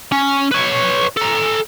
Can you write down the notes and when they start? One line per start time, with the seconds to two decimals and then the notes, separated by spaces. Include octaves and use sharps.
0.12 C#4
0.51 B4 C#5
1.17 A4 A#5